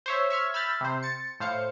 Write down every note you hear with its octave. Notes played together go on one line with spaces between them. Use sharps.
C5 C#5 E5
E5 C#6 F6 G#6
B5 E6 F6 G6 A6
C3 C5
A6 C#7
A2 C5 F5 C#7